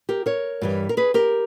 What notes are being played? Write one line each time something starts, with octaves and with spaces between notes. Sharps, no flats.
G4 A#4
A#4 C#5
G2 E3 G3
A#4
G#4 B4
G4 A#4